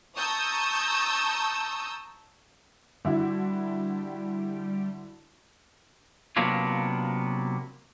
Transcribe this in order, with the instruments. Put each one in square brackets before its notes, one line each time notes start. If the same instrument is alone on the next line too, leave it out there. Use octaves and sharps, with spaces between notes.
[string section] A5 A#5 C#6 D#6 E6 G6
[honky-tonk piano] D3 E4 F#4 [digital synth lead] G3
[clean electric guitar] C3 F#3 A#3 B3 D4 F4